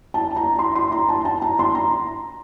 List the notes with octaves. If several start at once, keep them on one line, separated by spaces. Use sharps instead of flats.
A5
A#5
C6
C6
A#5
A5
A5
A#5
C6
A#5